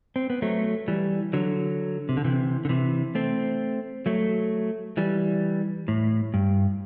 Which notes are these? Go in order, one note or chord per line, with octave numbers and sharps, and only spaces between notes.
C4
B3
F#3 A3
E3 G3
D3 F#3
C3
D3
C3 E3
D3
C3 E3
A3 C4
F#3 A3
E3 G3
A2
G2